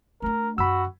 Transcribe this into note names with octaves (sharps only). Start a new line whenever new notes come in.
A3 D4 A#4
F#2 D#3 F#4 B5 E6